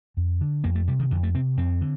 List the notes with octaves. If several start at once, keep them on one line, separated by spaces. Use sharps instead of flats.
F2
D3
F2 A#3
A3
C3 G3
D#3
F2 D3
A3
C3 C4
F2 C4
D3